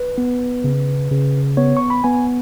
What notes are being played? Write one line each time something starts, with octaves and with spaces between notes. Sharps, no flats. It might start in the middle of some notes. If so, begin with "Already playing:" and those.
Already playing: B4
B3
C#3
C#3
B3 C#5
C#6
B5
B3 G#5